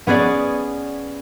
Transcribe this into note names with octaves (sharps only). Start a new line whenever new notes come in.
B3 C#4 G#4 D5